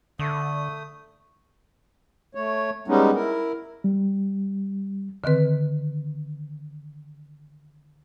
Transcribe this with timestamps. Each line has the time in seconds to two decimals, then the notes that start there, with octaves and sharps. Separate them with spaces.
0.19 D3 A3 D#6
2.35 A3 C#5
2.88 G3 G#3 B3 C#4 D#4
3.16 E4 A#4
3.84 G3
5.24 D3 D#3 C4 B4